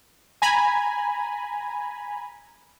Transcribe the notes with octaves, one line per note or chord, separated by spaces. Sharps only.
G#5 A#5 B5